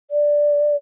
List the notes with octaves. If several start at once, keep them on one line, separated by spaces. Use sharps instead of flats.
D5